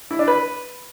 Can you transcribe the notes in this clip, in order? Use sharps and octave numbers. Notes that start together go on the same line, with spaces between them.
E4
D4
B4